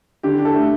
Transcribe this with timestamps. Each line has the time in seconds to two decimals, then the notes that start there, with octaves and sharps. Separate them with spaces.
0.23 D3 G4
0.39 D4
0.45 A4
0.55 A3